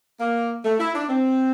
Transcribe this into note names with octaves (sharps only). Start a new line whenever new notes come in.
A#3
A3
E4
D4
C4